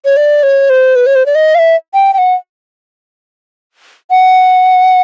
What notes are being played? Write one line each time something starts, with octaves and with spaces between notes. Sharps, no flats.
C#5
D5
C#5
C5
B4
C#5
C5
D5
D#5
F5
E5
G5
G5
F#5
F#5